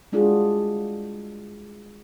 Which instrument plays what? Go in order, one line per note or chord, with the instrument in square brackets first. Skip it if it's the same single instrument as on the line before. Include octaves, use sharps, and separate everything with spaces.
[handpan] G3 G#3 D4 F4 F#4 G#4